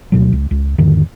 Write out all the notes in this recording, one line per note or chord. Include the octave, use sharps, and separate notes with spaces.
D2 B2 F#3
C#2
C#2
E2 G#2 D3 D#3